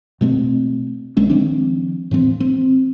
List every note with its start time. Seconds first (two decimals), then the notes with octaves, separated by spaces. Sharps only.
0.21 B2 A3 C4
1.17 A#1 G#3 C#4
1.30 D#3 F3 C4 D4
2.11 A2 E3 C4
2.40 C4